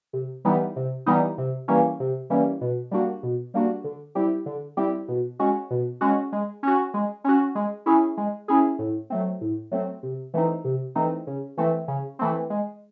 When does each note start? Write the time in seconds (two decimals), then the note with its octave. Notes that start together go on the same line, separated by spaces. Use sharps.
0.13 C3
0.45 E3 G3 B3 D#4
0.76 C3
1.06 E3 G3 B3 D#4
1.38 C3
1.68 E3 G3 A#3 C#4
2.00 C3
2.30 E3 G3 A#3 C#4
2.61 B2
2.91 G3 A#3 D4 F#4
3.23 B2
3.54 G3 A#3 D4 F#4
3.84 D3
4.15 G3 C4 E4 G4
4.46 D3
4.77 G3 C4 E4 G4
5.08 B2
5.39 G#3 C#4 F#4
5.70 B2
6.01 G#3 C#4 F#4
6.32 G#3
6.63 C#4 F#4
6.94 G#3
7.24 C#4 F#4
7.55 G#3
7.86 C#4 E4 G#4
8.17 G#3
8.48 C#4 E4 G#4
8.79 A2
9.10 F#3 A3 C4
9.41 A2
9.71 F#3 A3 C4
10.03 C3
10.34 E3 A3 C4 D#4
10.64 C3
10.95 E3 A3 C4 D#4
11.27 C#3
11.57 E3 A3 C4
11.88 C#3
12.19 E3 A3 C4
12.50 G#3